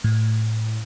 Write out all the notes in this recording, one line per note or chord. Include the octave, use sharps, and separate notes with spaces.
A2